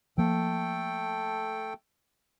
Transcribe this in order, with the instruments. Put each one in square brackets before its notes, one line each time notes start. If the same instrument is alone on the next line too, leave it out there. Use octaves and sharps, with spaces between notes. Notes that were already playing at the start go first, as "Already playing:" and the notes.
[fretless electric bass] F3 A#3 [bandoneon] A3 A4 G5